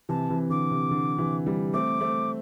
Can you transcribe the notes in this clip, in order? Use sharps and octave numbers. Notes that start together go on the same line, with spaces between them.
C3 E3 A5
C3 E3
D3 D6
C3
D3
C3 E3
E3 G3
A3 C4 D6
A3 C4